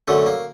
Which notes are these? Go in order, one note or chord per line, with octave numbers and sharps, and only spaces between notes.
F#2 D3 F#3 A3
A#3